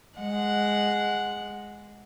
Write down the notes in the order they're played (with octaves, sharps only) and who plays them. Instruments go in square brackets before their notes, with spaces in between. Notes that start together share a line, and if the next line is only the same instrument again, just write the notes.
[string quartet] G#3 F#5